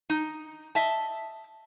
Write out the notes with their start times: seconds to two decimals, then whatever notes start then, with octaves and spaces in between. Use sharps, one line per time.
0.10 D#4
0.75 D#5 E5 A5